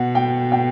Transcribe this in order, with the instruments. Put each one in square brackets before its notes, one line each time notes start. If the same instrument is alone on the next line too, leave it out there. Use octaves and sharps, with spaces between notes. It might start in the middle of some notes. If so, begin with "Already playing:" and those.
Already playing: [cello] B2 [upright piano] F#5
[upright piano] G5
G5